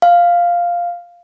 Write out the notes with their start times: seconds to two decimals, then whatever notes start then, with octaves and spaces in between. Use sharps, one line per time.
0.02 F5